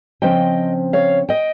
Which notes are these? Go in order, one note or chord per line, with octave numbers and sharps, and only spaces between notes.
C#3 F3 C4 D#5 G5
C#5 F5
D#5 G5